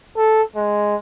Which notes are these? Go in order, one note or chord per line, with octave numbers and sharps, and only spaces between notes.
A4
G#3